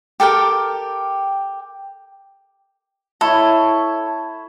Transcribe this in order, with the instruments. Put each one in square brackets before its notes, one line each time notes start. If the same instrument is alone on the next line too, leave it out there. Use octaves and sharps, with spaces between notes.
[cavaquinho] G4 A4 A#4 G5
[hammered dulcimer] E4 C#5 [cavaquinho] A4